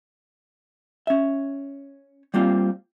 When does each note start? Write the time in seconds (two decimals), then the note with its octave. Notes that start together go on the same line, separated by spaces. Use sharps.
1.07 C#4 E5
2.34 G3 A#3 C4 F4